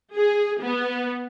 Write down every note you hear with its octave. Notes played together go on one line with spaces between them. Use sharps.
G#4
B3